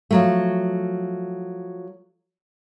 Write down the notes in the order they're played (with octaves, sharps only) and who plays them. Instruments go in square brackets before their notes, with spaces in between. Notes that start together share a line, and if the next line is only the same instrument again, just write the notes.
[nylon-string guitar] F3 F#3 A3